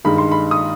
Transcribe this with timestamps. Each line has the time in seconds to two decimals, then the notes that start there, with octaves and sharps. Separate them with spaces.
0.05 G2 D#3 G#3 B5
0.18 C6
0.32 B5
0.51 D#6